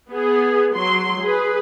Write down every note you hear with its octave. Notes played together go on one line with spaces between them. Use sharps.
B3 G#4
F#3 C6
G#4 B4